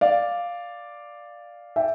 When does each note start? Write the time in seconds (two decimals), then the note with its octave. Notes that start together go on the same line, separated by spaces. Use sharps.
0.01 D5 F5
1.76 E5 G5